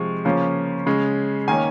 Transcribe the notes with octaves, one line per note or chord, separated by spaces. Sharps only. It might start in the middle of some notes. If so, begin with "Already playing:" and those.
Already playing: C3 F3 G#3 C#6
C#3 F3 A#3 C#4
C#3 G#3 C#4
D#3 A#3 C#4 G#5